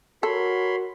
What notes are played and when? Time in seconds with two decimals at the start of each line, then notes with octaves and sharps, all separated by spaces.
0.23 F#4 A4 A#4 C#5 B5 C6